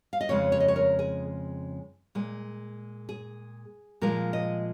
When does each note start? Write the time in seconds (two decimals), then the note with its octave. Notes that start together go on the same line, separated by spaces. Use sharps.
0.13 F5
0.21 D#5
0.29 F2 C#3 G#3 C#5
0.52 C#5
0.60 D#5
0.68 C#5
0.76 A#4
0.99 G#4
2.15 A#2 G#3
3.09 G#4
4.01 A#2 F3 G#3 A#4
4.33 D#5